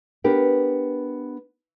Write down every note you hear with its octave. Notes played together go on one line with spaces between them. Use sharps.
B3 D4 G4 A#4 B4